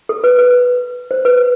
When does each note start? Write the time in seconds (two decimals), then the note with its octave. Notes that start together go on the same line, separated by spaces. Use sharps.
0.09 A4
0.24 B4
0.38 B4
1.11 C5
1.25 B4